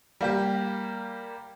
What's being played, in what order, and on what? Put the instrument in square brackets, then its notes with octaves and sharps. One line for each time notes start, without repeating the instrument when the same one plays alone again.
[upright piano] G3 A#3 G4